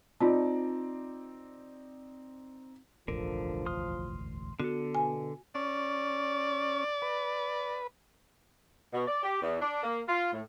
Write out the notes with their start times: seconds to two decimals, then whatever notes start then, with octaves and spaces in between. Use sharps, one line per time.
0.20 C4 D#4 F4 D5 A5
3.08 E1 A1 D2 D3 F3 A#4
3.66 C6 D#6 F6
4.60 D3 B3 F#4 A4
4.95 B2 G#5
5.55 C#4 D5
7.02 B4
8.93 B2
9.08 D5
9.23 G4
9.42 E2
9.61 D4
9.83 A#3
10.08 F4
10.32 A2